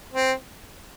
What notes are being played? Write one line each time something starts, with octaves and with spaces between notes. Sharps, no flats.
C4